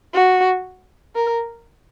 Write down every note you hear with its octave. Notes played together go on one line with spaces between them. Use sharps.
F#4
A#4